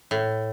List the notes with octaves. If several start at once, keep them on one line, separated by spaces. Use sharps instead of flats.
A2